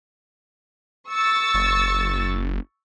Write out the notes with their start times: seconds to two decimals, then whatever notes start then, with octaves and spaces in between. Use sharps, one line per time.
1.11 C#6 E6 A6
1.54 F#1